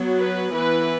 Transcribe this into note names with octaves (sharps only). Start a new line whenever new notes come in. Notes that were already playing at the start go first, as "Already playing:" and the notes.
Already playing: F#3 B3
B4
E3 B3 B4